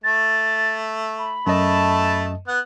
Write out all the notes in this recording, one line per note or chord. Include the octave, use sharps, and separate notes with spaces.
A3 A6
B5
F#2 A3 D#5 A5
B3 F#5